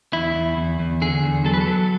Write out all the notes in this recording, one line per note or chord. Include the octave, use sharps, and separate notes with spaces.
E2 E4
E2
E2
E2
D3 G#4
E2
F#3 A4
B4
A4
F#3